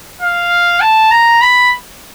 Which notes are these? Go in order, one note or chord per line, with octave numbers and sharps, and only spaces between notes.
F5
A5
A#5
B5